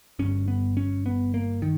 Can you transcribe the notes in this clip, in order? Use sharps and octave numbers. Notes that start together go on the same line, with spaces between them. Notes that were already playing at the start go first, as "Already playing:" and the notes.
G1 G2 C#4
B3
C#4
B3
A#3
D#3